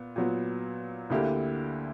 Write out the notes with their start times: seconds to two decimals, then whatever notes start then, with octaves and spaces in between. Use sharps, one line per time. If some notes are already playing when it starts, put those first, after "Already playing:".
Already playing: A#2 B3
0.16 A#2 F#3 B3
1.10 D2 D3 A#3 E4 G4